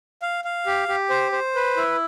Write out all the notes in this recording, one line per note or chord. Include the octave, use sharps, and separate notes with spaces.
F5
F5
G4
G4
C5
C5
B4
E4